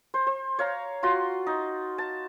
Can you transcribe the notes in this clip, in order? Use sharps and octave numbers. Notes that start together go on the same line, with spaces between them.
C5
C5
C#5 F5 A#5
F4 F#4 C6
D#4
A5